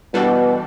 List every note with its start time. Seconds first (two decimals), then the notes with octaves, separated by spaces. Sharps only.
0.14 B2 E3 G3 D4 F#4 A4